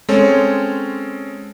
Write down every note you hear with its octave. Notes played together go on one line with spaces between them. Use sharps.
G#3 C4 C#4 A4 C#5